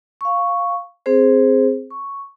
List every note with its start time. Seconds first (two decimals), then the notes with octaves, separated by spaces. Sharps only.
0.21 F5 C#6
1.06 C4 G#4 C5
1.91 C#6